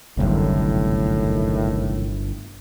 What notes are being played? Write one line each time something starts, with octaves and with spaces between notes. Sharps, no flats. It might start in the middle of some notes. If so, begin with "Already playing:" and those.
G1 C2 F#2 A2 D#3